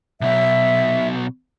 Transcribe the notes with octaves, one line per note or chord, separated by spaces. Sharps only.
B1 B2 E5